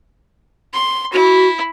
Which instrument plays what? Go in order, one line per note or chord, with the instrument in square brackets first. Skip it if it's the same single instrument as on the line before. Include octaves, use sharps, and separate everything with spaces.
[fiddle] C6
[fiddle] E4 [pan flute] F#4